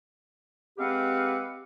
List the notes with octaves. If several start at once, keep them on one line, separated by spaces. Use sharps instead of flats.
G#3 C4 G4 B4 F5 F#5